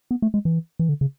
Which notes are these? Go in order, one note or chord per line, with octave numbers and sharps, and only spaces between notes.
B3
A3
G#3
E3
E3
D3
C#3